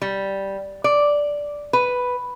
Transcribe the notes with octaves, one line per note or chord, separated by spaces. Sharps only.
G3
D5
B4